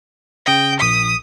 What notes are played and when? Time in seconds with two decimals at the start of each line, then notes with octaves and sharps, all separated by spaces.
0.46 C#3 G5 D#6 A#6
0.80 A#1 D#6 B6